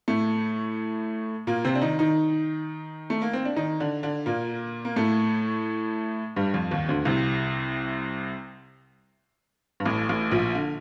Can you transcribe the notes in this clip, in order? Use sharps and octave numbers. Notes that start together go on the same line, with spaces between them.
A2 A3
A#2 A#3
C3 C4
D4
D#3 D#4
D#3 D#4
A3
A#3
C4
D4
D#3 D#4
D3 D4
D3 D4
A#2 A#3
A#3
A2 A3
G2 G3
F2 F3
D#2 D#3
D2 D3
C2 C3
G2
A1 A2
A1 A2
A#1 A#2
D3